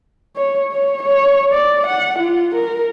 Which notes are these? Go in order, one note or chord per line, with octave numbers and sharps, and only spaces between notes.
C#5
C#5
C#5
D5
F#5
F4
A#4